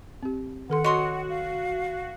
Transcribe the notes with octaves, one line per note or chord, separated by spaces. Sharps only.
C4 G4
D#3 A4 F#5 C6
F#4 C#5 D#5 C6 D#6
F5